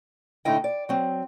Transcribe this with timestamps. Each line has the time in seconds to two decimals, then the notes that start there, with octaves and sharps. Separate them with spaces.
0.45 A2 D3 D#4 E4 D#5 G5
0.64 D5
0.89 F#3 C4